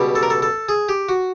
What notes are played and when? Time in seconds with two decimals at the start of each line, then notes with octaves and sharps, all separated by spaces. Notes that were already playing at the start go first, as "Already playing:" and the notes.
Already playing: C#2 B2 G3
0.15 A4
0.23 A#4
0.30 A4
0.42 A4
0.69 G#4
0.89 G4
1.09 F#4